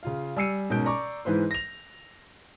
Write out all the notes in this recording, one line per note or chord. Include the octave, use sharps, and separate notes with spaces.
C#3 F4 F5
G3 G#5 E6 C7 C#7 D#7
G#2 B2 C#4 A#4 G6 D7
D5 A#5 C#6 D6
G#2 E3 B4 C5
A#6 F7